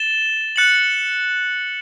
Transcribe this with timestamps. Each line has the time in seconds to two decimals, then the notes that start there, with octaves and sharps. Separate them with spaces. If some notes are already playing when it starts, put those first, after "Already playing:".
Already playing: A6 E7 G7
0.56 F#6 A6 C#7 F#7